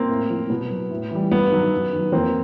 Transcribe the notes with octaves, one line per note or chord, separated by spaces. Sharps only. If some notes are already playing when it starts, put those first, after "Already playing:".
Already playing: A#3 C4
A2
F3
B2 B3
F#3
A2
E3 G3
G2 B3
D#3 F#3
F#2
D#3 F#3
F2 A#3 C4